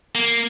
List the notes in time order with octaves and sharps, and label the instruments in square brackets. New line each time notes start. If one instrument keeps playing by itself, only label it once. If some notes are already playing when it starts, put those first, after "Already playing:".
[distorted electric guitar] A#3